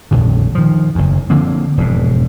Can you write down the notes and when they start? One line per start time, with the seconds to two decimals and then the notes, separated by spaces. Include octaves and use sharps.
0.11 D#1 A#1 F2 D3
0.55 D#3 F3
0.95 F#1 E2
1.30 D3 F3 A#3 C4
1.77 E1 F2 G#2